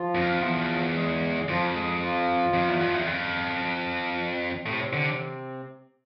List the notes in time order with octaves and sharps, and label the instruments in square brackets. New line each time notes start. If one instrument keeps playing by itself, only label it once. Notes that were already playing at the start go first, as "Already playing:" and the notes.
Already playing: [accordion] F3 F4
[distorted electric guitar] F2
E2
[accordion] G#3 G#4
[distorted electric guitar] F2 [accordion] F3 F4
[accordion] G#3 G#4
F3 F4
[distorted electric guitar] F2
E2
F2
E2
F2
[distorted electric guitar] A2 [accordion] C3 C4
[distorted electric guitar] D3